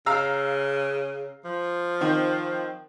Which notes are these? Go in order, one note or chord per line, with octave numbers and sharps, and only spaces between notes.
C#3 F5 A#5 E6
F3
D#3 C4